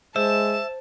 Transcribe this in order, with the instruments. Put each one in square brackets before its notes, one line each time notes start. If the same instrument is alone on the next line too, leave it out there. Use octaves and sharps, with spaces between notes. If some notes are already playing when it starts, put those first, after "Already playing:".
[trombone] G#3 [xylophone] C5 [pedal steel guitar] E5 [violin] A5 E7